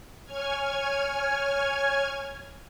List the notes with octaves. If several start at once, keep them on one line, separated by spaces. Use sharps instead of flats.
C#5 G#5 F6 G#6